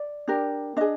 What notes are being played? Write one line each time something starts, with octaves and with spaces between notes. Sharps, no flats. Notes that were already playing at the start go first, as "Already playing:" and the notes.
Already playing: D5
D4 G4 A#4
D4 G#4 D#5